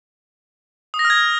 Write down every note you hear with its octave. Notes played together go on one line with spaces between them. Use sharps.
D#6
A#6
F6
G#6